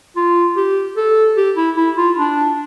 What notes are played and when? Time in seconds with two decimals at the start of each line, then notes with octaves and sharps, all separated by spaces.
0.16 F4
0.56 G4
0.97 A4
1.37 G4
1.57 E4
1.77 E4
1.97 F4
2.17 D4